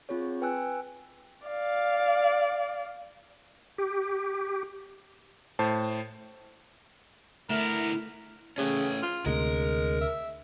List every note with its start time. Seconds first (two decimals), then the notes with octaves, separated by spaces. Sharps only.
0.09 C4 F4 G#4 C#5
0.41 B4 G5 G#5 E6 F#6
1.47 D5 F5
3.78 G4
5.59 A2 C5 A5
7.50 D3 A3 B3 E4 A#4
8.58 C#3 A3 C#4
9.02 F4
9.26 D2 C3 G#3 A#4
10.01 E5